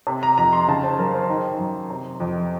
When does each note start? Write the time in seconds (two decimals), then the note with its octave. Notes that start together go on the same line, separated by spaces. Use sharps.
0.07 C3
0.23 A#5
0.38 F2 A#5
0.53 C6
0.68 C#3 A5
0.84 C5
0.99 F#2 A#4
1.14 C5
1.29 D#3
1.59 F#2
1.90 C3
2.20 F2